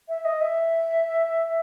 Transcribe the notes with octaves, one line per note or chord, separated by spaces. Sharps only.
E5
D#5
E5